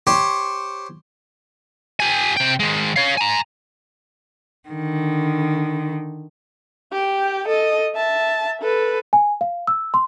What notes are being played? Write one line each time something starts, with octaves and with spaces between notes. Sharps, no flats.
G4 C5 C#5
G4 G#5
C3 G5
D#3 G#3
C#5 F5
G#5 A#5
D3 D#3
G4 G5
A4 D#5
E5 A5
A4 B4
G#5
F5
E6
C6